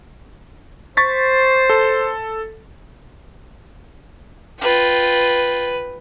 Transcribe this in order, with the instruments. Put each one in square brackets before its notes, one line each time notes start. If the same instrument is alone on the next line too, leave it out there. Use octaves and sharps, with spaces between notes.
[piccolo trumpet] C5 [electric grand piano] C#6 A6 B6
[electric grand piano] A4
[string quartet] F4 G5 [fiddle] B4